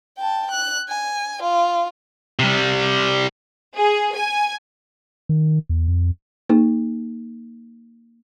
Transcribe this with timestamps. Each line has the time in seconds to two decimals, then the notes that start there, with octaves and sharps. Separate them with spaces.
0.18 G5 A5
0.51 F#6
0.89 G#5
1.43 F4
2.39 C3 G3
3.76 G#4
4.14 G#5
5.29 D#3
5.69 E2
5.88 F2
6.49 A#3 D#4 G#4